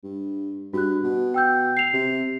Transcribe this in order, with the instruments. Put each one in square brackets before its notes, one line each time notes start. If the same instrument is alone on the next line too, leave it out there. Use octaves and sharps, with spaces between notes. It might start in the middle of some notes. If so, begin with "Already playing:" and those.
[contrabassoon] G2
[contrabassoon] G2 [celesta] F#4 F#6
[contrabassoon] B2
[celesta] G5 E6 G6
C7 F7
[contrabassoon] C3